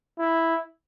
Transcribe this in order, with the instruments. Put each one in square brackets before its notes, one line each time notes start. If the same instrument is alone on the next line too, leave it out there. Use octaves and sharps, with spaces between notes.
[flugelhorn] E4